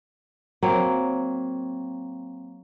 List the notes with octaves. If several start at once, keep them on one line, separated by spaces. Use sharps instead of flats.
F#3 A#3 C4